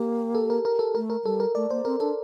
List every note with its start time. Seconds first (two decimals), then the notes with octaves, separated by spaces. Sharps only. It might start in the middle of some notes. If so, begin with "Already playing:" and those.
Already playing: A#3 G4
0.35 A4
0.50 A#4
0.65 A#4
0.79 A4
0.95 A3 A#4
1.10 A#4
1.25 G3 A4
1.40 A#4
1.55 A3 D5
1.71 A#3 C5
1.85 C4 A#4
2.00 D4 A4